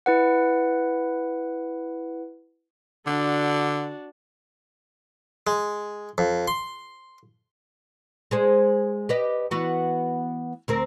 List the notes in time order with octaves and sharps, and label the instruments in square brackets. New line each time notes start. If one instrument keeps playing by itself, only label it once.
[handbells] E4 B4 F#5
[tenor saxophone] D3 [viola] D4 F#4
[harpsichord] G#3
F2
C6
[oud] G#3 G#4 C5
G4 B4 D#5
E3 B3 F#4
D2 C4 A#4